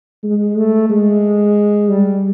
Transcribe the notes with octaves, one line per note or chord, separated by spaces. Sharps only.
G#3
A3
G#3
G3